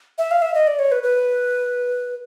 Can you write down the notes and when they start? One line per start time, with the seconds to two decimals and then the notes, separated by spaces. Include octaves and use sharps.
0.18 E5
0.31 F5
0.42 E5
0.54 D#5
0.67 D5
0.79 C#5
0.92 B4
1.03 B4